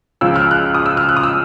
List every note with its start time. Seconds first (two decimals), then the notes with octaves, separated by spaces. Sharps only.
0.21 C#2 C#3 F3 E6
0.36 F6
0.51 F#6
0.75 D#6
0.86 E6
0.97 F6
1.09 F#6
1.17 D#6
1.23 E6